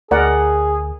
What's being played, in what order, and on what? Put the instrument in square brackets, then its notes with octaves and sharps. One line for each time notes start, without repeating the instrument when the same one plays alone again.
[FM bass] D2 [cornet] G#4 [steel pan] A#4 D5 F#5